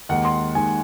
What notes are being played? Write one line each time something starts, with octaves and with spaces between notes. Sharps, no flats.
D#2 D#3 G#3 F#5
C6
D#2 D#3 G#3 G#5